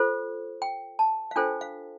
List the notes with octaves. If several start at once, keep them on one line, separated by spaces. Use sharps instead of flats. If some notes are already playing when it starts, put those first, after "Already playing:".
Already playing: F4 A4 C5
G5
A5
F5
D4 F4 A4 C5 G5
F5